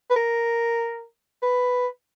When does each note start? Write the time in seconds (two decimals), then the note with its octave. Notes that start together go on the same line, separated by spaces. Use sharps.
0.10 B4
0.16 A#4
1.43 B4